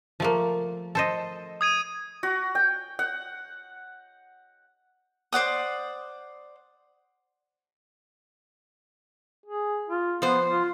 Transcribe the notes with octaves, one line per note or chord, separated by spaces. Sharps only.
F3 A3 A#3
A4 C5 D#5
D#6 G#6 D#7
F#4
G5
F#5
C5 D5 F#5 D#6
G#4
F4
F3 B3 C5
F4